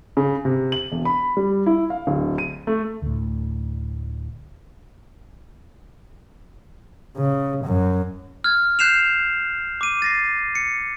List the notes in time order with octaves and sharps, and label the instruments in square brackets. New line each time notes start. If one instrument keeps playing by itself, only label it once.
[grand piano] C#3
C3
F#7
E1
B5
G3
E4
F5
D1
D#7
A3
[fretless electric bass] D2 A2
[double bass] C#3
F#2
[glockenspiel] F6 G#6
F#6 G6 C7 E7 F7
D6 D#7
A6 A#6 C7
C#7